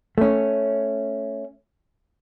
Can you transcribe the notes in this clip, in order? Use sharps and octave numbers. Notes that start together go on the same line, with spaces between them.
A3 C#4